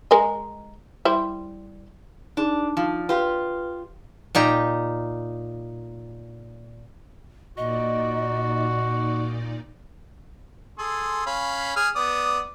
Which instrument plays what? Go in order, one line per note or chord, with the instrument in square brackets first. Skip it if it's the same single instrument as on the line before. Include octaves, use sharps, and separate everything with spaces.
[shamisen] G#3 A#4 D#5
G3 E4 C5
[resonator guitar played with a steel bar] D4 [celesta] D#4 G#4
[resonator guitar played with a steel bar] F3 [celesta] D#4
[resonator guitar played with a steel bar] F4 G4 [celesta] B4
[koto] A#2 D#4 G4
[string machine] A#2 D#4 D5 [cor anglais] F#4 [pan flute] D#5
[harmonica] G#4 A4 C6
C#4 F5 B5
G#4 F6
B3 D5 D#6